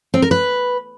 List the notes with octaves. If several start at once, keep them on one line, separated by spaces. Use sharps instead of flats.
C4
A#4
B4